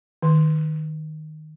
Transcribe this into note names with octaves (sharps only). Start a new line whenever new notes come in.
D#3